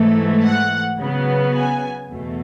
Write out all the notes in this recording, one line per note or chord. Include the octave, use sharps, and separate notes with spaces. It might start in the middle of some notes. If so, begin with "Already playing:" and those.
Already playing: G#2 E3 A3
F#5
C#3 F#3 B3
G#5
E2 B2 A3